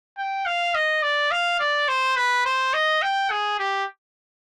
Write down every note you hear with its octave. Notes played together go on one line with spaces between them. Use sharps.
G5
F5
D#5
D5
F5
D5
C5
B4
C5
D#5
G5
G#4
G4